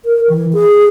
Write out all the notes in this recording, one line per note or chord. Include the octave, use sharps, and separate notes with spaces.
A#4
E3
G#4